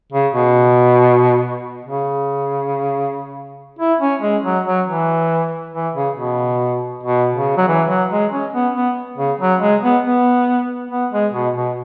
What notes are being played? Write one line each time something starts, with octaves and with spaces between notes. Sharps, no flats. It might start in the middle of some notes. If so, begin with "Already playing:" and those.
C#3
B2
C#3
E4
C#4
G#3
F#3
F#3
E3
E3
C#3
B2
B2
C#3
F#3
E3
F#3
G#3
C#4
B3
B3
C#3
F#3
G#3
B3
B3
B3
G#3
B2
B2